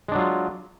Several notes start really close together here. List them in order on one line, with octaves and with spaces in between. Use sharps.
G#3 D4 F#3 F4